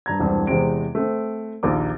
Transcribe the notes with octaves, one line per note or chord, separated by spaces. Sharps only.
G2 A#5 G#6
E1 C2 G2 C4
E2 C3 G#3 C4 D7
A3 C4
A#1 D#2 A#4 D6